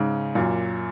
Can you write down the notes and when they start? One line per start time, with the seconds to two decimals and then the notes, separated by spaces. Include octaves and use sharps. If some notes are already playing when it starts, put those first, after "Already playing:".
Already playing: G#2 C#3
0.35 F#2 A#2